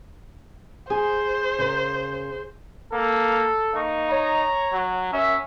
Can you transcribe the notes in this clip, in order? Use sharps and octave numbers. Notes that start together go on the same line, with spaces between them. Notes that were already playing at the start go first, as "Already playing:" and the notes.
G#4 C5 G#5
C#3 A#4
A#3 A4
A#3 D#4 C#6
C#5 A#5
F#3
F#2 C#4 E5